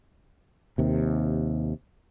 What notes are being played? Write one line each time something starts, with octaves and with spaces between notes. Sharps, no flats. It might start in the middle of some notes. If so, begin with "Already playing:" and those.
D#2 C3